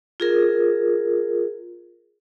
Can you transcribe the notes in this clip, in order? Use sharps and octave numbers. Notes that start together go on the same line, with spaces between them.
F4 G#4 A#4